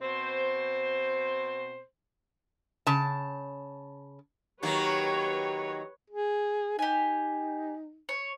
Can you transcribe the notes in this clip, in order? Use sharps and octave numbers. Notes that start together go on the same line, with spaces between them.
B2 C4 C5
C#3 A5
D#3 F#3 A#3 G4 B4 C#5
G#4
D#4 G4 G#5
C#5